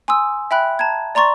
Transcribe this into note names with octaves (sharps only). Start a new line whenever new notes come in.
G#5 C6 D#6 E6
E5 G5 B5 F#6
A5 A#5 G#6
D5 A#5 C6 C#6 A6